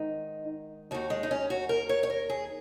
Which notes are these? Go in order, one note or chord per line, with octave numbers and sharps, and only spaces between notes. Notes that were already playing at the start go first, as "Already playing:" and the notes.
Already playing: G#2 D#3 D#4
D#2 D#3 F#4
G#3
D#4
C#4
F#4
A#4
C#5
C#5
A#4
G#4